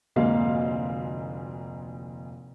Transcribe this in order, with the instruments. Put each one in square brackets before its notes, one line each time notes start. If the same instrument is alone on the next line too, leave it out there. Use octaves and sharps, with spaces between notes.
[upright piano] F1 D2 G#2 A#3 F5